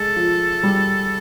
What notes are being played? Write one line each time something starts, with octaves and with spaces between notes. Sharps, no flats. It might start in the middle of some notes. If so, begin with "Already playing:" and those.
Already playing: G#3 A4
F3
G3